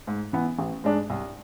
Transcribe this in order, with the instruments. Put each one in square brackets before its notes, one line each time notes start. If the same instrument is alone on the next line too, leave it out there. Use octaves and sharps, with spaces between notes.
[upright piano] G#2
E3 B3
A1
G#2 G#3 D4
C2